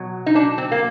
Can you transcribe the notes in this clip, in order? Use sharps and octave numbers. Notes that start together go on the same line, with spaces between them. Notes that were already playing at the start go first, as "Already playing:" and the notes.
Already playing: B2 F#3
D#4
D4
C4
A#3